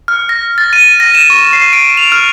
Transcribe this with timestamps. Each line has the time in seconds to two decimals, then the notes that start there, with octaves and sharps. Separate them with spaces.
0.08 F6
0.29 A#6
0.58 A6
0.73 D#7
1.00 A#6
1.15 E7
1.30 C#6
1.53 C7
1.73 D7
1.97 F7
2.12 F6